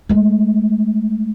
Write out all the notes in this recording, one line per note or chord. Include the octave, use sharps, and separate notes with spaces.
G#3 A3